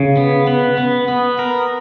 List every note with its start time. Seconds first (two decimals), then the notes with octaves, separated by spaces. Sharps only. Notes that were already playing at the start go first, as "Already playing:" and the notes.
Already playing: C#3
0.17 B3
0.47 B3
0.78 B3
1.08 B3
1.39 A#4